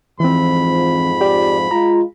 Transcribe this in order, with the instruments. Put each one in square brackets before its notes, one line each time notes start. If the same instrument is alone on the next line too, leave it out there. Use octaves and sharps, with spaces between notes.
[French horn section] F2 G#2 F3 [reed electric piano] E3 C4 [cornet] B5
[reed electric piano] G4 D5
[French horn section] G#3 F4 [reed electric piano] A#5